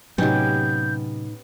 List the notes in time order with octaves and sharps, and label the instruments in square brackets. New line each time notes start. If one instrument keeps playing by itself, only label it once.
[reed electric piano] A2 D#4 [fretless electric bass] C3 F#3 [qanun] B3 C#4 G4 [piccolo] G6